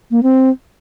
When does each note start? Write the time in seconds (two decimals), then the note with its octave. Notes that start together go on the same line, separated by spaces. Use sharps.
0.11 A#3
0.23 C4